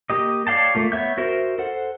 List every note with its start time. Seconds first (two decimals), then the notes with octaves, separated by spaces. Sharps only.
0.10 A#3 G4 D#5
0.47 C#5 D5 F5 G5 A5
0.75 A3 A#3 F4
0.92 B3 C#5 E5 G6
1.18 F#4 A#4 C5 E5
1.59 A4 C5 F#5